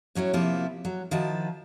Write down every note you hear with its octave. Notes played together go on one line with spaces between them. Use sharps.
A2 F#3 C#4 E4
C3 F3 A#3 E4
F#3
D#3 F3 E4 F#4 A5